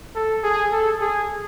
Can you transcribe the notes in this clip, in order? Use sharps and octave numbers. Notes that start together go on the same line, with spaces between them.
A4
G#4
A4
G#4